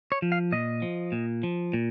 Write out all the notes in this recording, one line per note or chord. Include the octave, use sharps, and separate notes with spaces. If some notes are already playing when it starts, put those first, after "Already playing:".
C#5
F3
F5
A#2 D#5
F3
A#2
F3
A#2